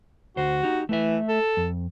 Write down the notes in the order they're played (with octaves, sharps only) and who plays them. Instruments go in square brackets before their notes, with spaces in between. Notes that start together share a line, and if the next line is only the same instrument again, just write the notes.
[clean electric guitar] D2 C5 [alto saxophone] F#4
[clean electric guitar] D#4 G4
[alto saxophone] E3 [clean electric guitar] A3 E5
[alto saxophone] A4
[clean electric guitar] F2